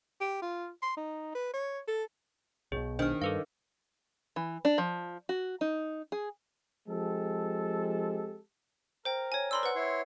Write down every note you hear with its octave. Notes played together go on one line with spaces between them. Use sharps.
G4
F4
C6
D#4
B4
C#5
A4
B1 B2 G#4 C#5
D#3 D4 C5 F6
G2 A4 B4 F5
E3
D4
F3
F#4
D#4
G#4
F3 G#3 C4 G4 A4
A#4 C5 G5
C#5 G#5
A#4 C5 D5 B5 C6 E6
B4 F#5
E4 C#5 C6